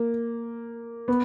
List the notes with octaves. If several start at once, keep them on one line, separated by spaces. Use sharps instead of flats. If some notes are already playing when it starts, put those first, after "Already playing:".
Already playing: A#3
B3